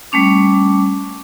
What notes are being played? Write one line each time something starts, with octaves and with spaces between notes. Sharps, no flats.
G3 A3 C#4 D6